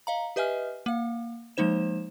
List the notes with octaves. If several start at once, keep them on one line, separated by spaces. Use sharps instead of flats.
D#5 F5 A#5
G4 B4 D#5 E5 G#5 F6
A#3 F5
F3 G#3 A#3 D#4 C5 E7